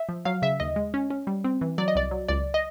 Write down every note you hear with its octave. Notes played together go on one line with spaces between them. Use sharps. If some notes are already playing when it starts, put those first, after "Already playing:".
Already playing: E5
F3
F#3 F5
C#3 E5
D#2 D#5
G#3
C#4
C#4
G3
C4
E3
F#3 D5
D#5
C2 D5
F#3
C#2 D5
D#5